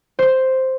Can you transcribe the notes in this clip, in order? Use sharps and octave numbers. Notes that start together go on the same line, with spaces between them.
C5